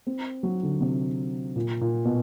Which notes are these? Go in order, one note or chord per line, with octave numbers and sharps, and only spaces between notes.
C4
F#3
D3
C3
A#2
A#2
B2